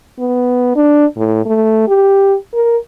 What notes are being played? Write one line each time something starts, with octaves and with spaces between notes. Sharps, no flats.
B3
D4
A2
A3
G4
A#4